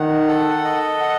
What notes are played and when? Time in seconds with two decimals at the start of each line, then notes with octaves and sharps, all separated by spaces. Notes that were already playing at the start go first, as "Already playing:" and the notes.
Already playing: D#3 F#5
0.28 A4
0.64 D#5
1.00 F#5